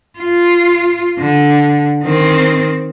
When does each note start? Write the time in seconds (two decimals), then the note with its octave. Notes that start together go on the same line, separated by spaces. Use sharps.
0.18 F4
1.19 D3
2.04 D#3 C4